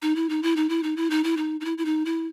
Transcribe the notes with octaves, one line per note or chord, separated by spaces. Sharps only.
D#4
E4
D#4
E4
D#4
E4
D#4
E4
D#4
E4
D#4
D#4
E4
E4
D#4
E4